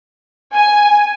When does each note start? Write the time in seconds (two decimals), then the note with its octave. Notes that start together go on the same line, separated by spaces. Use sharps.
0.54 G#5